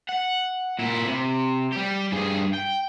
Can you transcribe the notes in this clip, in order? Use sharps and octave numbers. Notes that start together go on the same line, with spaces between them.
F#5
A#2 E4
C3
G3 G4
G2 G#4
G5